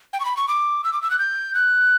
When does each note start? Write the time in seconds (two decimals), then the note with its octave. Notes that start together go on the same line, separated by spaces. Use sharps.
0.13 G5
0.20 C#6
0.25 B5
0.37 C#6
0.48 D6
0.84 E6
0.93 D6
1.02 E6
1.11 F#6
1.19 G6
1.54 F#6